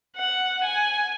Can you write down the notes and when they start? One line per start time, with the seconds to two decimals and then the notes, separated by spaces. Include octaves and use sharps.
0.17 F#5
0.65 G#5